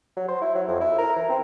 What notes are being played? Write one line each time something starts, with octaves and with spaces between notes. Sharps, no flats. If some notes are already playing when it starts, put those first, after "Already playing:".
F#3
C5
E4
F#3
F2
E4
A#4
E3
C4